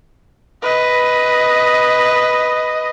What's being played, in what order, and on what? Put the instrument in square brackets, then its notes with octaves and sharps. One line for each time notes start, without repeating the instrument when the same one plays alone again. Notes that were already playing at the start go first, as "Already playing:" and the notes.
[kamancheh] B4 D#5